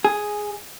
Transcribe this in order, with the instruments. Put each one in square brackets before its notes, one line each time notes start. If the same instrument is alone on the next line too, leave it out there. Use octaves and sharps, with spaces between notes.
[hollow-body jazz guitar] G#4